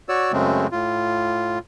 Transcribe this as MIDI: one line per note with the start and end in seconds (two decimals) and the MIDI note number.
0.09 0.32 66
0.09 0.32 73
0.09 0.32 74
0.09 0.32 88
0.32 0.67 42
0.32 0.67 49
0.32 0.67 56
0.32 0.67 57
0.32 0.67 60
0.72 1.59 45
0.72 1.59 65